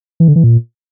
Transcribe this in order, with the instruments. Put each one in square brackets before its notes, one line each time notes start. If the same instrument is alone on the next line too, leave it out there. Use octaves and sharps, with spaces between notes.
[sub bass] E3
D3
E3
A#2